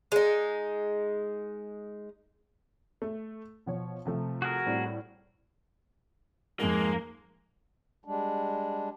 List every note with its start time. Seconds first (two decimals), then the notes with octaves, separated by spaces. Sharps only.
0.12 G#3 D#4
3.02 A3
3.66 B2 F3 C#5
4.05 C3 F3 A3
4.42 F#4 G#4 A#4
4.66 A2 G3 C4
6.60 F2 G#2 G#3 A#3
8.05 G3 G#3 D4